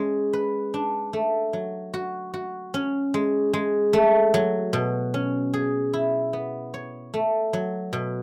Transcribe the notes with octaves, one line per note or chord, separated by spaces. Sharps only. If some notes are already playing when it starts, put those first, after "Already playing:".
Already playing: G#3 C#4
B4
D4
A3
F#3
F#4
F#4
C#4
G#3
G#3
A3
F#3
B2
C#4
G#4
E4
B3
C#5
A3
F#3
B2